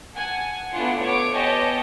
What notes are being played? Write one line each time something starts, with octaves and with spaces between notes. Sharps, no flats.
F#5 G#5 A5
A3 B3 D4 E4 F4 F#5
C#5 D6 D7
B3 G4 C#5 D#5 G#5 A5